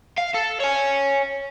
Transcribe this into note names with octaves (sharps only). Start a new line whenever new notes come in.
F5
A4
C#5 G#5